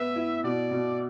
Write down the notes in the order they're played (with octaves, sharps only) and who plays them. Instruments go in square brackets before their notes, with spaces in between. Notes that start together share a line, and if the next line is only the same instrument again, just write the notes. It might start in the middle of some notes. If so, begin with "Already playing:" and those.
Already playing: [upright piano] B3 B4 [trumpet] E5
[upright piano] E4
[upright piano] B2 [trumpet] D5
[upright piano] B2